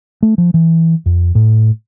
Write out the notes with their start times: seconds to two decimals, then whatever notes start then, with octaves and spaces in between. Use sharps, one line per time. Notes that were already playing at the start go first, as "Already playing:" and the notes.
0.23 A3
0.38 F3
0.54 E3
1.06 F2
1.35 A2